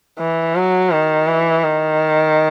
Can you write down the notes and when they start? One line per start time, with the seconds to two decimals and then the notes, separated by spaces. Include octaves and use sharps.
0.19 E3
0.56 F#3
0.91 D#3
1.28 E3
1.64 D#3